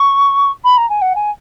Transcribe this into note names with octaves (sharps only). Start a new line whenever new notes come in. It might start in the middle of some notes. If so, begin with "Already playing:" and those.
Already playing: C#6
B5
A#5
G#5
F#5
G#5